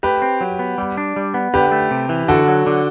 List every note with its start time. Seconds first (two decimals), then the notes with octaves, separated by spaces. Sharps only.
0.03 A3 G4 B4
0.22 C4
0.41 F#3
0.59 B3
0.78 G3
0.97 D4
1.16 G3
1.34 B3
1.54 D3 G4 B4
1.72 A3
1.91 C3
2.09 E3
2.28 D3 F#4 A4
2.48 F#3
2.67 D3